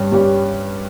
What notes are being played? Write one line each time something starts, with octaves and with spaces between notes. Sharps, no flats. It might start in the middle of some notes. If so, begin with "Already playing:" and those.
Already playing: G2 G3 C#4 G4
G2 G3 C#4 G4